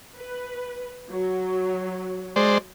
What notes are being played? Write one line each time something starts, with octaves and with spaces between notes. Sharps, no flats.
B4
F#3
G#3 C5 D5